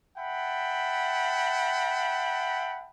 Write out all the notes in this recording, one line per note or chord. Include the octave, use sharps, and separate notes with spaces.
E5 F#5 G5 A5 B5